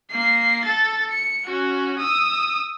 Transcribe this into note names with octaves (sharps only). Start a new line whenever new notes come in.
A#3 C7
A4 A6
C#7
C#4 F#4
D#6 E6